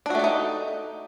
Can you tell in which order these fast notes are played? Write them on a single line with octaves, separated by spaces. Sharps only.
D4 F#4 A3 G4 D#4